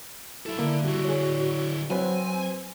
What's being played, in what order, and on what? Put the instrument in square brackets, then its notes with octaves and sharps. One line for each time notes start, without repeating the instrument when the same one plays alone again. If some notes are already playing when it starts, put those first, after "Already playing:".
[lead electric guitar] F#3 A4 [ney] E4
[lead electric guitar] D3 [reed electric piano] A#3
[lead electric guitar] D3 E4 [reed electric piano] G3 [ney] F#4
[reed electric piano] G#4 C#5
[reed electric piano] F#3 B4 C5 [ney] C4 [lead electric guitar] G#5